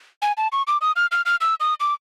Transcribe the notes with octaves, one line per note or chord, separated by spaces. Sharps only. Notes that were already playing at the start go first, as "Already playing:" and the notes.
G#5
A5
C#6
D6
D#6
F6
F6
F6
E6
D#6
D6